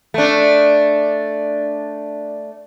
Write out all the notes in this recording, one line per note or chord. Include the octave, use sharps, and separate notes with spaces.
A3 D4